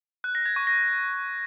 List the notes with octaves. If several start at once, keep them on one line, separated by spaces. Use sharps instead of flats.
F#6
A#6
G#6
C#6
A#6